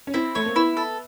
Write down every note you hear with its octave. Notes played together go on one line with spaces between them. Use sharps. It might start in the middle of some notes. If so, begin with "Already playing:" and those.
C#4
C4 E4
A3 C#5
A#3
B3 E4
A4